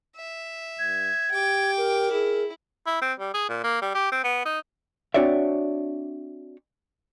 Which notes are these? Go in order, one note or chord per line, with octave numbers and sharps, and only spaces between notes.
E5
G2 G#6
G4 G5 D6
A#4
E4 G#4
E4
C4
G3
G#4
A#2
A#3
G3
G4
C4
B3
D#4
C4 D4 F#4 C#5 D5 E5